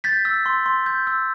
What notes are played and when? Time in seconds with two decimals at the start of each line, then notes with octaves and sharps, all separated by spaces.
0.04 G6 A6 B6
0.25 E6
0.46 C6
0.66 C6
0.86 G6
1.07 E6